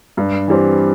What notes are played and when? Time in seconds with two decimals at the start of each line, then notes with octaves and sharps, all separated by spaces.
0.17 G2
0.48 E3 G3 C4